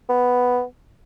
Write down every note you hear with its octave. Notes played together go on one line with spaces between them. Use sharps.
B3